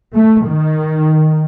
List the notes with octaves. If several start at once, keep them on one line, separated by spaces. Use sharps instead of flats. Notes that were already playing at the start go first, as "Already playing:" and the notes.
A3
D#3